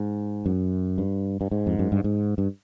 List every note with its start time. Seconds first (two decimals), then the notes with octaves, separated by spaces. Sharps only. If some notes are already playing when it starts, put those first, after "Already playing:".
Already playing: G#2
0.46 F#2
0.98 G2
1.41 G2
1.51 G#2
1.66 F2
1.79 F#2
1.92 G2
2.04 G#2
2.38 G2